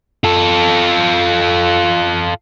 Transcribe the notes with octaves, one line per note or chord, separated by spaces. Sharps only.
F4 A4